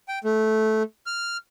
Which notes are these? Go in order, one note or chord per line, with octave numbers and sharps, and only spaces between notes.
G5
A3
F6